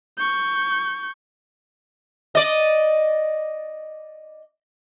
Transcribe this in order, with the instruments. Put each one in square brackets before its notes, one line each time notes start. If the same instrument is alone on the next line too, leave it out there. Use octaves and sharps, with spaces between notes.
[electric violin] C#6 G6
[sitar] D5 D#5